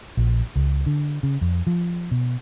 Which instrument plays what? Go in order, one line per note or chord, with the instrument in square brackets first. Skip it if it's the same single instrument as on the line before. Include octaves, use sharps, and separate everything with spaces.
[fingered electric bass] A#1
C#2
D3
C#3
F2
F3
B2